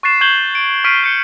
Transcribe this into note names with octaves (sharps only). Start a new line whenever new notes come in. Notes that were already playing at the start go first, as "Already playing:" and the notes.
C#6 F#6 A6 C7 E7
C#6 G6 G#6 E7 F#7 G7
D7
C#6 F6 B6 C7 D7 D#7
G6 C#7